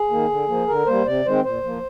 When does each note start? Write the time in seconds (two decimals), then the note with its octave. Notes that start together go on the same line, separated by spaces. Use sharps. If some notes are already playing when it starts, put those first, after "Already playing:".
Already playing: G#4
0.11 D#3 A#3
0.30 D3
0.48 F3 A#3
0.68 D3 A#4
0.86 G3 A#3 C5
1.06 C3 D5
1.26 D#3 G#3 C4 C5
1.44 A#2 C5
1.64 F3 A#3